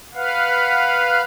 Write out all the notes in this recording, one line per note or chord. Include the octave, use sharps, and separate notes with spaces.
B4 F5 F#5